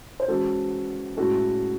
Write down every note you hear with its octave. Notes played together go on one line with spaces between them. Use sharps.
C5
E3 G#3 C#4 E4 F#4 A4
A2 G#3 C#4 E4 F#4 A4